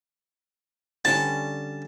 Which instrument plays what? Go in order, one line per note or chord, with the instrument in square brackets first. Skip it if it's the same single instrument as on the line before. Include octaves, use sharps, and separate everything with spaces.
[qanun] D3 G3 C#4 [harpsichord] A5